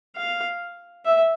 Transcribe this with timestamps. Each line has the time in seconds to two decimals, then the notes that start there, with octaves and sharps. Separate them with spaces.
0.16 F5
1.05 E5